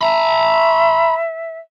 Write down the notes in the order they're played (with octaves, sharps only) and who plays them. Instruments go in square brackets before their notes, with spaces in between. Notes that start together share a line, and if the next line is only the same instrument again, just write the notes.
[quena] E5 [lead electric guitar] A#5 B5